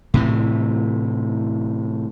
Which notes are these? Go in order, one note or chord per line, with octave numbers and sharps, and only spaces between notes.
A2 C3 E3